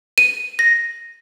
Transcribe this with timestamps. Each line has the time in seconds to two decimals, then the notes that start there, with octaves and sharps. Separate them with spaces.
0.18 D#7
0.59 A#6